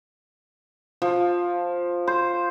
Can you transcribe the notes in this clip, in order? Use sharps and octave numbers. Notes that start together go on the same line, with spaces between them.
F3
C5